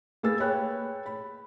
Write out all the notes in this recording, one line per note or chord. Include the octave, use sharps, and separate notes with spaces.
A#3 G#4 B4 E6 A6
G#4 B4 C#5 G5 B5 F#6
B5